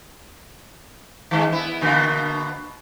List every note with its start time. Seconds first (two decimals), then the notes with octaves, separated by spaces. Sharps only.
1.31 D#3 G#3
1.52 B3 E4
1.81 B2 D3 A#3